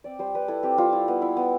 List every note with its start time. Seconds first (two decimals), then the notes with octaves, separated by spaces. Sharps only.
0.04 C4 D5
0.19 G3 C5
0.35 G3 B4
0.48 E4 A4
0.63 C4 G4
0.78 G3 F4
0.93 E4
1.08 B3
1.22 E4
1.37 B3